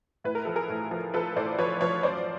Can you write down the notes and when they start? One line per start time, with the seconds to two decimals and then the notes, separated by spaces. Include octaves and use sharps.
0.24 A2 B4
0.35 A#4
0.45 F3 A4
0.55 G#4 A#4
0.69 A2
0.91 F3
1.14 F3 A4 B4
1.36 A2 C5 D5
1.59 F3 B4 C#5
1.81 F3 B4 C#5
2.03 F#2 C5 D5